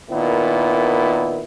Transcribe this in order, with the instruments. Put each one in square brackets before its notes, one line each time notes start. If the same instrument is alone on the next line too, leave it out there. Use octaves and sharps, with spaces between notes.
[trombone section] A#2 D#3 B3 E4